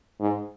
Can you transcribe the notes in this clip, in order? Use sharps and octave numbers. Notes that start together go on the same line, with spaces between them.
G#2